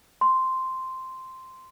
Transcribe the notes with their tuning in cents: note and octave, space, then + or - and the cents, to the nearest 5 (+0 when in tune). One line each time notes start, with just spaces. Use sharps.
C6 -5